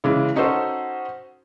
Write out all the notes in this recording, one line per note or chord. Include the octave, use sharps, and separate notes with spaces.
C#3 E3 G#3
C#4 D#4 F#4 A4 C5